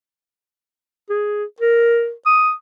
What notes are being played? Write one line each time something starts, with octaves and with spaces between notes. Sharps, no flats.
G#4
A#4
D#6